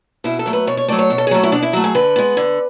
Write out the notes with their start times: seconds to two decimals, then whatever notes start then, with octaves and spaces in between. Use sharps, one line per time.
0.24 B2 E4
0.39 A4
0.46 F#3 A3
0.53 B4
0.67 B2 C#5
0.77 C#5
0.88 F#3 A3 D5
0.99 C#5
1.10 B2
1.18 A4
1.27 G#4
1.31 F#3 A3 F#4
1.43 E4
1.52 B2 D4
1.63 E4
1.73 F#3 A3 F#4
1.84 G#4
1.95 D3 B4
2.16 G#3 B3
2.37 D3